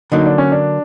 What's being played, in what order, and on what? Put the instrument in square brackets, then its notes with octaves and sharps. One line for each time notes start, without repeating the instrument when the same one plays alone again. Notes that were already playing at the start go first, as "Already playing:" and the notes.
[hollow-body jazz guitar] D3 F#3 A#3 [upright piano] D#4
[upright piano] D4
C#4
D4